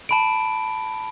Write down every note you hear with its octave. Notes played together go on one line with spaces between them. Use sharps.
A5 B5 D7